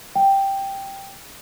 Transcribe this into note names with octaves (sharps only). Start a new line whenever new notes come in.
G5